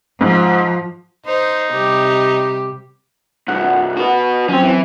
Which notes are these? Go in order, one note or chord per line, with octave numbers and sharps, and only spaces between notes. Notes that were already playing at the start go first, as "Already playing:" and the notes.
G#2 F3
D#4 C5
C3 G3 G4
C2 G2 F#5
F#4 B4
F#3 C4 C#4
E3